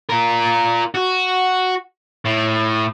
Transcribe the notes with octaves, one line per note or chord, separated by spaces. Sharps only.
F4 A#4
F#4
A2